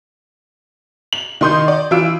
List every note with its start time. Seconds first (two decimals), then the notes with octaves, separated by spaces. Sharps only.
1.13 F#7
1.41 D#3 D#4 C6 D#6 G6
1.68 D5
1.91 E3 F4 E6 D7